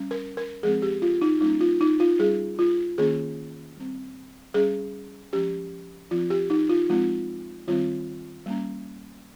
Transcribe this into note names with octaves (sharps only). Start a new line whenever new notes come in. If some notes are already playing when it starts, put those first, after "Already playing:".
Already playing: G3 C#4
A#4
A#4
F3 G#3 C4 G#4
G4
F4
D#4
G3 A#3 C#4 D#4
F4
D#4
F4
G3 C#4 G#4
F4
D#3 A#3 C#4 G#4
G3 C4
G3 C#4 G#4
F3 G#3 C#4 G4
F3 C4 F4
G4
D#4
F4
F3 G#3 C4 F4
D#3 G3 C4 F4
G3 A#3 C#4